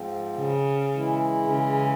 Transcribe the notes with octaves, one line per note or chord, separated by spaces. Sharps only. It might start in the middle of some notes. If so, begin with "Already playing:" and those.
Already playing: G#2 F3 C4 F4
C#3
E3 G#3 E4
C#3